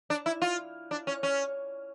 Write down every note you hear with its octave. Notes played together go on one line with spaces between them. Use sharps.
D4
E4
F4
D4
C#4
C#4